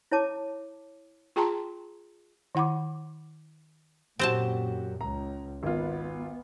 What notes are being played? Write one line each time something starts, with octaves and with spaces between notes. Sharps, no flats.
E4 C#5 A5 D6
F4 G#4 G5 A5 A#5 C6
D#3 E4 F#5 B5 D6
F#2 A#2 C4 F#4 G4 C5 A5
C#2 A#5
G#1 B3 F4